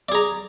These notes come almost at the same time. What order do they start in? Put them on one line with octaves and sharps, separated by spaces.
D5 G#4 A#5